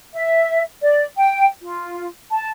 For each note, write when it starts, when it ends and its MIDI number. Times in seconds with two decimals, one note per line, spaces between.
0.14 0.61 76
0.82 1.05 74
1.17 1.45 79
1.61 2.07 65
2.30 2.50 81